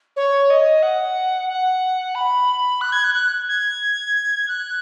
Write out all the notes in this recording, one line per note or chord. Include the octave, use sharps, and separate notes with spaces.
C#5
D#5
F#5
F#5
B5
F#6
G#6
F#6
F#6
G#6
F#6